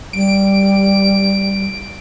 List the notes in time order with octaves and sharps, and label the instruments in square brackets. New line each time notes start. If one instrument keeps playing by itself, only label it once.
[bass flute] G3 [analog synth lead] D7